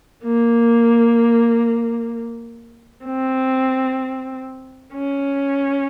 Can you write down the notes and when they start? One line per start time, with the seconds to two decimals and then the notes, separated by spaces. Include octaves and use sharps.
0.23 A#3
3.05 C4
4.93 C#4